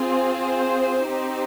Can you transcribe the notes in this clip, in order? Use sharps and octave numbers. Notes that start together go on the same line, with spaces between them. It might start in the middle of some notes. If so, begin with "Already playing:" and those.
Already playing: C4 F4 G#4
C5
C4 D#4 G4